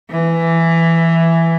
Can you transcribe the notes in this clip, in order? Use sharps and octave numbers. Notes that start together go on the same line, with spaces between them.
E3